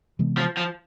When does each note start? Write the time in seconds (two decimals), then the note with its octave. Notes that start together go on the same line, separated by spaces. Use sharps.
0.19 C3 E3 G#3 B3
0.38 F3
0.57 F3